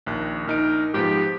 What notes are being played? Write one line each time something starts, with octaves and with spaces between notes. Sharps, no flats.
A#1 D#2 F#6
A#1 D#4 A#4 D7
G#2 F3 B3 G4